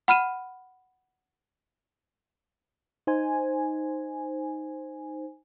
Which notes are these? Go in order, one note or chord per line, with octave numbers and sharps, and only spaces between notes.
F#5 B5 F6 D#7 E7
D#4 C5 G#5